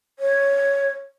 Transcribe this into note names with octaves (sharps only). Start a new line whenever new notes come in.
C#5